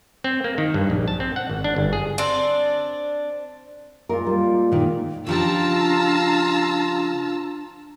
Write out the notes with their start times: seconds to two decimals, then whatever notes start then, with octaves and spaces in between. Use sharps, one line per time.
0.24 C4
0.44 A#3
0.58 D#3
0.74 G2
0.90 A#1
1.08 A5
1.20 C4
1.36 F#5
1.49 G#1
1.64 D4
1.76 G1
1.93 G#4
2.18 C4 D4 D5
4.09 A#2 G#3 F4 A#4
4.27 G3 D5
4.72 A#2 D#3 E3
5.27 C#3 F3 D4 F4 G4 A5 A#5 E6